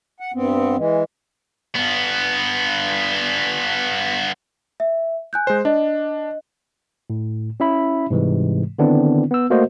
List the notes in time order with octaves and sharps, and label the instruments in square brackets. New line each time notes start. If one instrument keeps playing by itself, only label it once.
[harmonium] F#5
G2 B3 C4
E3 G#3
[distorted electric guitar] G2 B3
[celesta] E5
G#5 F#6 G6
[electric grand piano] G#3 C5
[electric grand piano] D4 [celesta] D#5
[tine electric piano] A2
C#4 E4 E5 B5
G#2 C3 E3 G3 G#3
D3 D#3 B3 C4 D4 E4
B3 E6
A3 A#3 F#4 A#4 C5 D#5